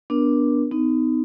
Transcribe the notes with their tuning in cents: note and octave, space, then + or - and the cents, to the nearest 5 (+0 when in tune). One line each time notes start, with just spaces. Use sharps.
B3 +0 D4 +0 A#4 +30
B3 +40 D#4 +0